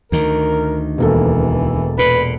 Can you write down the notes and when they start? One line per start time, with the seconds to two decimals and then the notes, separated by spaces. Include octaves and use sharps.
0.12 D2 D#3 A#4
0.98 E1 E3 A#3 A4
1.99 A#2 B4